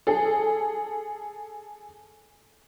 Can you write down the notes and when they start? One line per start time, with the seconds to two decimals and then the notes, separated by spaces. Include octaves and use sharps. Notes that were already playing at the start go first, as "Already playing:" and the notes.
0.07 G#4 A4